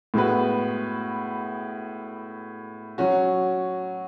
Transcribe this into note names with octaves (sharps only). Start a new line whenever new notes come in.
A2 G#3 B3 F#4 B4
F#3 C#4 F#4